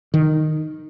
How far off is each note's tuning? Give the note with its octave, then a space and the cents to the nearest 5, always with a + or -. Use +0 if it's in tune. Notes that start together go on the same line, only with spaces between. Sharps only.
D#3 -10